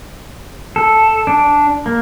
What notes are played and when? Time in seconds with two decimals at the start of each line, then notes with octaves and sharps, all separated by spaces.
0.76 A4
1.27 D4
1.86 A#3